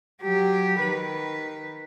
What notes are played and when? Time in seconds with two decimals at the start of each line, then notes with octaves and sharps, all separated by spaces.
0.23 F#3 G4
0.81 D#3 B4